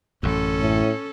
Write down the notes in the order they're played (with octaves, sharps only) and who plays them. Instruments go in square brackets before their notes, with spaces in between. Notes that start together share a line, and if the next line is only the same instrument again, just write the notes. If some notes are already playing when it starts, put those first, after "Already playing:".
[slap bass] A1 F#2 [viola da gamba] C#4 A4
[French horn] A2